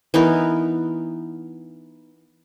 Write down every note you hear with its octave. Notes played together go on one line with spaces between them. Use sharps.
E3 B3 D#4 A#4